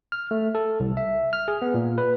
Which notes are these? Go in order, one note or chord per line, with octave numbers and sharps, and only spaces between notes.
F6
A3
A4
C2
E5
F6
G#4
B3
A#2
B4